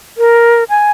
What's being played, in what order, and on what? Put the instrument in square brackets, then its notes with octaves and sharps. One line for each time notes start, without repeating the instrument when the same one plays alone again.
[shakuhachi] A#4
G#5